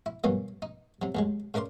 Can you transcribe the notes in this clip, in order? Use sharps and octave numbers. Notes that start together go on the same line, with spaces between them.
E4
G2 B2 E3 F#3 A#3
D#4
C3 F#3
D#2 F#3 G#3
C#3 D4 A#4 D5 C6